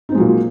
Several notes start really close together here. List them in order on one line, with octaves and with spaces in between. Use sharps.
D#4 C4 G#3 F#3 A#2